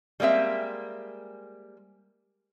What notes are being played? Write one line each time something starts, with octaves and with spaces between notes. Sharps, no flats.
G3 G#3 A#3 C4 E5